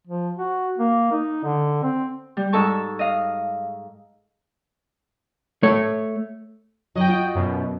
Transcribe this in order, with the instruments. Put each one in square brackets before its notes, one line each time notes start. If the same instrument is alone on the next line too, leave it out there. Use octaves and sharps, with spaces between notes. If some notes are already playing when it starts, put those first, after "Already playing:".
[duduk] F3
F#4
A#3
D#4
D3
C4
[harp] G3
G#2 D#4 A4 A5 C#6
D#5 F5
[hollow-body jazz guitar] A3 C#5
[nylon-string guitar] F#2 D#3 F#3 [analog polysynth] D#5 G5
[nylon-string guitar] F4 F#4
[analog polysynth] F#2 B2